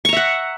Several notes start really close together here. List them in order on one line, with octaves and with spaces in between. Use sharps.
C#6 A#5 E5 F#5